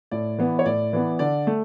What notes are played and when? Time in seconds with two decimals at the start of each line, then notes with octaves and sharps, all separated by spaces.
0.11 A2 D5
0.38 E3 B3
0.59 C#5
0.65 A2 D5
0.93 E3 B3
1.19 D3 D5
1.47 A3